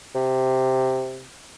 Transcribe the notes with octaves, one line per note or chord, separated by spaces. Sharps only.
C3